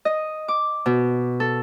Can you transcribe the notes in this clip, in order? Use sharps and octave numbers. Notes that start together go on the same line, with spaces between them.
D#5
D6
B2
A4